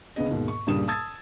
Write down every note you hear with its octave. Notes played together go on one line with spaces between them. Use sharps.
C#2 D3 B3 G#4 D#5
D#2 G#2 B2
C#6
C#2 G2 A#2 G3 D#6 E7
A5 D#6 E6 G#6 A6